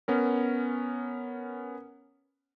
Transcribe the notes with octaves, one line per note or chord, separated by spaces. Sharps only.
B3 C#4 A#4